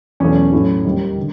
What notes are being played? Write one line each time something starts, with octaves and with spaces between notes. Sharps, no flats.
E2 B2 F#3 A3 C#4
A2 F#3 A3
D#2 D#3 G3
D3